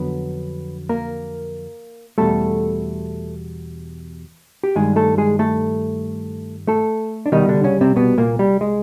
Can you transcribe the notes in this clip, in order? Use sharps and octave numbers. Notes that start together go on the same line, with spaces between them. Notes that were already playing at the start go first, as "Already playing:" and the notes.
Already playing: F2 D3 F#3 B3
A#3 A#4
E2 B2 G3 A3 A4
G4
G2 D#3 G3 G#3 G#4
A3 A4
G#3 G#4
A3 A4
A3 A4
D4
C2 B2 D#3 G3 D#4
D3 D4
C#3 C#4
C3 C4
B2 B3
A#2 A#3
G3
G#3